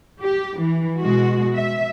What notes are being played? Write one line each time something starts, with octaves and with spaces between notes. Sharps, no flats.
G4
E3
B2 G#3 F#4
E5